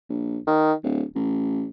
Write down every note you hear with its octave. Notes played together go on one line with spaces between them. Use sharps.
A#1
D#3
D1
A1